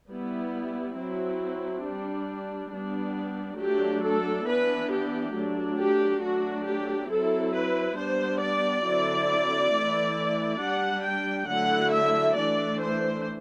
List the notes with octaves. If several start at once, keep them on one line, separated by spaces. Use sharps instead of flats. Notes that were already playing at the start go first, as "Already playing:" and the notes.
G3 B3 E4
F#3 C4 E4
G3 D4
G3 B3 D4
F#3 A3 D4 G4
A4
E3 B3 D4 B4
G4
F#3 A3 D4
G4
F#3 A3 D4 F#4
G4
F#3 C4 E4 A4
B4
G3 B3 D4 C5
D5
D3 F#3 C4 E4
E3 A3 E4
G3 D4 F#5
G5
D3 F#3 A3 E4 F#5
E5
E3 A3 D4 D5
C5